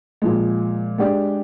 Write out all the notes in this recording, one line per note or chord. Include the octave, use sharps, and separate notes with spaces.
A#2 F3 G#3
G#3 D4 G4 D5